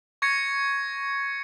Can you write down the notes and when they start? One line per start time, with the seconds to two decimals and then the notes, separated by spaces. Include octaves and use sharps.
0.22 C#6 G#6 A#6 C#7